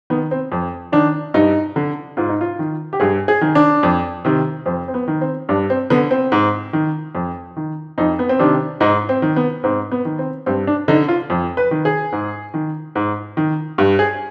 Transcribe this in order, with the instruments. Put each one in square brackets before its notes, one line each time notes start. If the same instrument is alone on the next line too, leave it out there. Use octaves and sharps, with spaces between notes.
[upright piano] D#3 B3
C4
F2
D#3 D4
G2 D#4
D3
G#2 F4
D#4
F4
D#3
G4
G2 G#4
G#4
D#3
D4
F2
C3 D#3
F2 C4
C4
B3
D#3
C4
G2 D4
C4
D3 B3
C4
G#2
D#3
F2
D#3
F2 D#4
B3
C4
C3 D#3 D4
G#2 D#4
C4
D#3
B3
G#2 C4
B3
D#3
C4
G2 C4
D4
D3 D#4
F4
F2
B4
D#3
G#4
G#2
D#3
G#2
D#3
G2
G#4